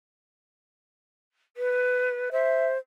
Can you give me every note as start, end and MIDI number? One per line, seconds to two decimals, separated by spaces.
1.56 2.29 71
2.32 2.78 72
2.32 2.68 76